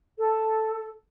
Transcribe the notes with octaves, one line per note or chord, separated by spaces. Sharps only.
A4